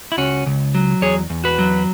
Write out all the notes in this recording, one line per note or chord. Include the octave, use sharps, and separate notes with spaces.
E4
C#2 C#4 F#4
C#2
F#3
E2 G#4 C#5
E2
F#4 B4
F#3